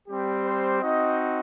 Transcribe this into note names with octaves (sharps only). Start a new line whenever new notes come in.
G3 C4 G4
C5
C4 D#4 F#4 D#5